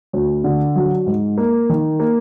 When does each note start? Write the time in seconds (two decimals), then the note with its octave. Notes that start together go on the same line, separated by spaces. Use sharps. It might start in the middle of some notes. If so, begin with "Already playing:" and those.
0.13 D2
0.44 D3
0.76 F#3
1.06 G#2
1.38 A#3
1.69 D#3
2.00 A#3